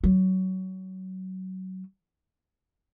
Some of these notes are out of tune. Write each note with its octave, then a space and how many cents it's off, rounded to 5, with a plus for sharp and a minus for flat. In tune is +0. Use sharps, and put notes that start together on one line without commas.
F#3 +20